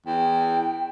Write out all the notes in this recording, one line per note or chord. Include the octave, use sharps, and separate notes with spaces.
E2 G5